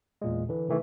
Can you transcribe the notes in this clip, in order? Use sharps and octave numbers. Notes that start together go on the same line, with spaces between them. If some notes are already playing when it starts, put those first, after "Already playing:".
E2 A#2 G#3
D3 E3
C3 D#3 E3 A3